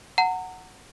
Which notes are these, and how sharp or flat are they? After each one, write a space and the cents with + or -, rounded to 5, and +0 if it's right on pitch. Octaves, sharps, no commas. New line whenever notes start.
F#5 +0 A#5 -30